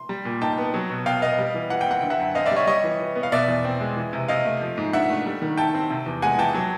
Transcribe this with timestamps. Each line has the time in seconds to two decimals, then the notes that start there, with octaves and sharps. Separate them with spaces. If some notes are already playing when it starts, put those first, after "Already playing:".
Already playing: C6
0.09 G3
0.25 A#2
0.41 D#4 G5 A5
0.58 B3
0.74 F#3
0.90 B2
1.06 B2 F5 G5
1.22 B3 D#5 F5
1.38 G3
1.55 E3
1.70 E3 F#5
1.81 G5
1.86 C4 F#5
2.01 D3 G5
2.10 E5 F#5
2.19 F#2
2.35 C4 D#5 F5
2.46 D5 E5
2.51 G3
2.56 C#5 D#5
2.67 G3 C#5 D#5
2.84 E3
3.00 E3
3.15 B3
3.23 F5
3.32 B2 D5 E5
3.48 E2
3.64 C4
3.80 G#3
3.96 E3
4.13 C3
4.28 C3 D#5 F5
4.45 A3
4.61 F3
4.78 G#2
4.93 D4 E5 F#5
5.10 A3
5.26 G3
5.42 D#3
5.57 E4 G5 A5
5.74 C4
5.90 C3
6.06 E2
6.22 G#3 F#5 G#5
6.38 E3 G5 A5
6.55 F#3